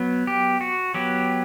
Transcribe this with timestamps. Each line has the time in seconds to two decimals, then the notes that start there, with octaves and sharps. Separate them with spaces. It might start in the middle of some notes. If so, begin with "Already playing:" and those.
Already playing: F#3 B3
0.27 G4
0.61 F#4
0.94 F#3 B3 G4